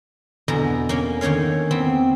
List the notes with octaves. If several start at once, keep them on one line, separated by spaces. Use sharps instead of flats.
E2 B2 D3 G#3 A#5
A#3 C#4
D3 D#3 C#4 C#5 F5
E2 B3 C4